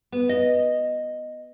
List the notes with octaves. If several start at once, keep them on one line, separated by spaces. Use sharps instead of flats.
B3
D#5